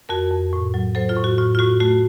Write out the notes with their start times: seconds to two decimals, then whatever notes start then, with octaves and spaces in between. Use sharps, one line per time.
0.09 F2 F#4 A#4
0.31 F2
0.53 A2
0.74 F#3
0.95 F#3 A4 C5
1.09 F4 A4
1.17 A2
1.24 F#4
1.38 A2 F4
1.55 F4
1.59 A2 F#4
1.80 A3 F#4